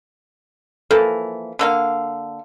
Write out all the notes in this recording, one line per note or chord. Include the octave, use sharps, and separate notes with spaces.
E3 F3 A#3 A4
D3 A#3 F5